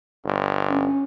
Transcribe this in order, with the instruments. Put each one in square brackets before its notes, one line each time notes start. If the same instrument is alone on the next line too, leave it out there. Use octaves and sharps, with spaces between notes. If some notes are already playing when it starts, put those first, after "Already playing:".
[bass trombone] G1
[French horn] C#4